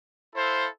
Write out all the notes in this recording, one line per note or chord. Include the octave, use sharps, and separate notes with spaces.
E4 A4 C5 F5